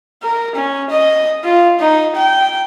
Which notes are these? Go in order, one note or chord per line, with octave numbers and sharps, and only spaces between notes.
A#4
C#4
D#5
F4
D#4
G5